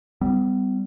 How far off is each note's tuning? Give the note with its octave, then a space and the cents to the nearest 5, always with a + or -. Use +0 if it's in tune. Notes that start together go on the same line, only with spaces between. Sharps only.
G3 +0 B3 +45